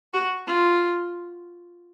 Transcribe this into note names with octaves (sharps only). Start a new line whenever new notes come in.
F#4
F4